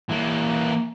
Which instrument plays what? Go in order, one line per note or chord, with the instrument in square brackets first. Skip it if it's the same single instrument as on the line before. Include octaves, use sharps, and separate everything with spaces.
[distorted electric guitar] E3 A#3